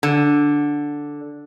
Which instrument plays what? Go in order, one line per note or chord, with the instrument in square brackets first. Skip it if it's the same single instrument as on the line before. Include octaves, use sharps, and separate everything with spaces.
[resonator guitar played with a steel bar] D3